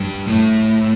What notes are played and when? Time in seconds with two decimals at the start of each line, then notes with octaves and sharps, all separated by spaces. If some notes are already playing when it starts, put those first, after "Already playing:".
Already playing: G2 G3
0.28 A2 A3